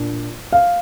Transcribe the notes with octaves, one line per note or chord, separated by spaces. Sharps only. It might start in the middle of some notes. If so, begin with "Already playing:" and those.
Already playing: A#2 D4
F5